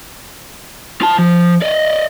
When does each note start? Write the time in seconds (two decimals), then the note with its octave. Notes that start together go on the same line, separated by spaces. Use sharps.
1.02 F4 A5
1.19 F3
1.62 D5 D#5